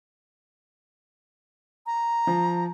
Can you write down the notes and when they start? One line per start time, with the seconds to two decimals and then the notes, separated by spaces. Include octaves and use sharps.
1.86 A#5
2.27 F3